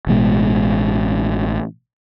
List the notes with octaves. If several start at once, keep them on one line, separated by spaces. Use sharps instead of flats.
A1 B2 G#3